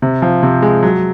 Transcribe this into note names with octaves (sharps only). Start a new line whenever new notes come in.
C3
F3
C3
G#3
F#3